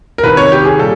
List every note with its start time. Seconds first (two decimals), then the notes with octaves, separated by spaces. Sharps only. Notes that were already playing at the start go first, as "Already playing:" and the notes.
0.18 A#4
0.23 C2 C3 D#3 B4
0.37 C#5
0.52 G4
0.65 G#4
0.79 A#2 G3 A4